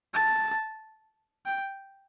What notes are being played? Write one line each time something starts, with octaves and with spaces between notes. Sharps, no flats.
A5
G5